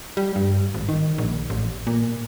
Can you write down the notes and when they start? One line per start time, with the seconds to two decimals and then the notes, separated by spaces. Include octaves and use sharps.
0.17 G3
0.36 G2
0.74 G#1
0.89 D#3
1.18 A#1
1.50 A1
1.87 A#2